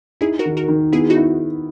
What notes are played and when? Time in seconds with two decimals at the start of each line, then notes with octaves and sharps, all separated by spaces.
0.21 D#4 E4 G#4
0.39 F#4 A#4
0.46 D#3
0.57 F#4 A#4
0.68 D#3
0.92 B3 E4 G#4
1.10 D#4 F#4
1.16 E4